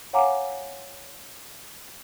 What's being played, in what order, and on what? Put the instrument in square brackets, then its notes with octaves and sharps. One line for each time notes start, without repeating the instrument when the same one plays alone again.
[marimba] C#5 F5 F#5 G#5 A#5 D6